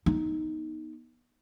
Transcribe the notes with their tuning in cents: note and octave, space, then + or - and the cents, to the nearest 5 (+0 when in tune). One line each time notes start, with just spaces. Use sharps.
B3 -20 D#4 +0